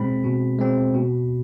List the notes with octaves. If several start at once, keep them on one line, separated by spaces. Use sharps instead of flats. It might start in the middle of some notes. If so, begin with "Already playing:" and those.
Already playing: B2 G#3 C4 B5
B2
G#3 C4
B2